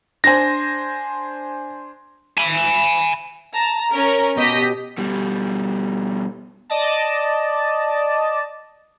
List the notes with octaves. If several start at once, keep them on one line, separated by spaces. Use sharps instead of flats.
D4 C5 G#5 A#6
G#5 B5
A5 A#5
C#4 A#4
B2 G4 D#5 B6
B2 G3
D5 D#5 A5